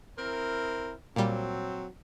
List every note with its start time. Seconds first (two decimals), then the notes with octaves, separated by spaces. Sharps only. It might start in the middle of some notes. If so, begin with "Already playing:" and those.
0.18 C4 E4 A#4
1.16 A#2 F#3 G3 C4